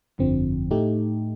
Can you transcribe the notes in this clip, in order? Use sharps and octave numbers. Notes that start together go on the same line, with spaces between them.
G1 F2 D3 F3 C4
A2 A3 D#4 G4